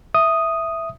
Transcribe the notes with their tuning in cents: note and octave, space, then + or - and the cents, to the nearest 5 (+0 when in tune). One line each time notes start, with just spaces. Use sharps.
E5 +0 D#6 +0